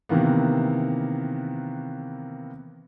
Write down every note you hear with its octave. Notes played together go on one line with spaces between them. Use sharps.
C3 D#3 E3 A#3 B3